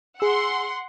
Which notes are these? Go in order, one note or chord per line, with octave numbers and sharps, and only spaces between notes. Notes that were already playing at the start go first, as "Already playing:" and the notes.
G#4 F#5 C6 E6